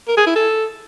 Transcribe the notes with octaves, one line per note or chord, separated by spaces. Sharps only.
A#4
G#4
E4
A4